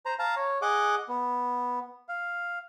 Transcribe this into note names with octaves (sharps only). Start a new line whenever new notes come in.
C5 A#5
F5 A5 A#5
C#5
G#4 D#5 F#5 D6
B3
F5